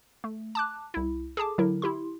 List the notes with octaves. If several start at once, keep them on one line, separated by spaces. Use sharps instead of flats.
A3
A5 D6 F#6
C2 E4
G#4 A4 A5 D6
D3 F#3 E4 A#4
E4 G4 C6